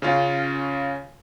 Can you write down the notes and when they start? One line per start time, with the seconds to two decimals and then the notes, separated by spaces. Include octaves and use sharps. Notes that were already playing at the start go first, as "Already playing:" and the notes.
0.02 C#3 C#4 F4